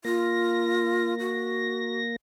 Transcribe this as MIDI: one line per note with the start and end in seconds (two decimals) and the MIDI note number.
0.05 2.16 58
0.05 1.15 65
0.05 2.16 94
1.20 1.99 66